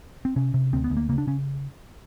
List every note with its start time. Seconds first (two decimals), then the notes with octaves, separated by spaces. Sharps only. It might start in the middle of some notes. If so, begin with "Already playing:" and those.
0.25 C4
0.36 C3 C#4
0.54 C3
0.73 D2 C4
0.84 B3
0.90 D2
0.97 A#3
1.09 C#3 A#3
1.18 D4
1.27 C#3 C#4